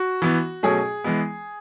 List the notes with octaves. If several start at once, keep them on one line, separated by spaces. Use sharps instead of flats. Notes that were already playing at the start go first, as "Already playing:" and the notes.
Already playing: F#4
E3 B3
B2 F#3 A3 C#4 G#4
E3 G#3 B3